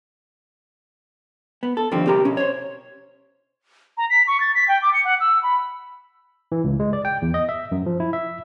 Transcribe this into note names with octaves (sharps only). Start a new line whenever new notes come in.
B3
A4
D#2 D3 F3 G3 C4
C2 C4 G4 A#4 A#5
B2 C#4
C5 C#5
A#5
B6
C#6
A6
B6
G5
D6
C#7
F#5
E6
B5
E3
C#2
G#3
D5
G5
E2
D#5
E5
F#2
F3
E4
E5